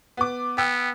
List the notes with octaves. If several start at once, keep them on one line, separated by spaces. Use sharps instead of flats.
B3 D6
B3 G5 E6